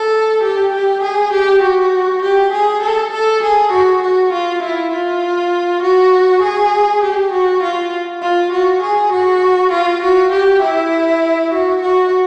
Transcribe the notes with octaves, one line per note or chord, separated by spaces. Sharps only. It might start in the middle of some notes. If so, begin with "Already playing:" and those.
Already playing: A4
G4
G4
G#4
G4
F#4
G4
G#4
A4
A4
G#4
F#4
F#4
F4
E4
F4
F#4
G#4
G4
F#4
F4
F4
F#4
G#4
F#4
F4
F#4
G4
E4
F#4
F#4